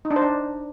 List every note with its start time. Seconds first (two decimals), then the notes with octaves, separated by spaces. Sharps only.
0.05 D#4
0.11 D4
0.16 C5
0.22 D4